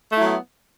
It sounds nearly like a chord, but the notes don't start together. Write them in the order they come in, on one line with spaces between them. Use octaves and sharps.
A3 E4 F#3 B3